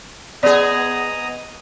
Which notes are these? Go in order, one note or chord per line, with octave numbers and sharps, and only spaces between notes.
B3 G#4 D5 D#5 A#5 D#6